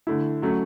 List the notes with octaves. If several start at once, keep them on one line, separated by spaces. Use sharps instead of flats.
D3 A3 E4
F#3 A3 C#4